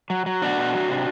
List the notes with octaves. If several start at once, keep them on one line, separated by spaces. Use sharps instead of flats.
F#3
F#3
B2 D4 F#4
B2
F#3
C3